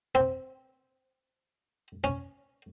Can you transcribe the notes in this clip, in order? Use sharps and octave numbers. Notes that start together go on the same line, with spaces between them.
C4
C#4